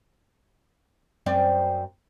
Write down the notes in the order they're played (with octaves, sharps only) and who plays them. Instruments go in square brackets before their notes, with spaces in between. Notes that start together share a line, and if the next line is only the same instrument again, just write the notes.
[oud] F#2 C4 D5